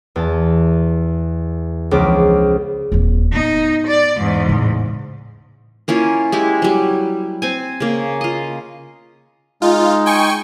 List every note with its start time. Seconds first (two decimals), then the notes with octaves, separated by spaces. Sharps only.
0.16 E2 A5
1.91 C#2 F3 B3 D6
2.92 D#1 F2
3.32 A2 B3 D#4
3.87 D5
4.17 E2 G#2
4.46 A2 C#3
5.88 A#3 C#4 E4 F4
6.32 G#3 E4 G4
6.62 F#3 G3
7.42 C4 G#5
7.80 C#3 A#3
8.21 F4 D#5
9.62 G#3 D#4 F4
10.06 G5 G#5 C#6